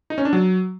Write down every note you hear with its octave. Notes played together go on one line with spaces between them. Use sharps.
D#4
C#4
D4
F#3